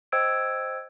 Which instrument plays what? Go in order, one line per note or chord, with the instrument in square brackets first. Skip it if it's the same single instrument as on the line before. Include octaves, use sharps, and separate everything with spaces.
[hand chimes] C5 D#5 G5 E6 G#6 D7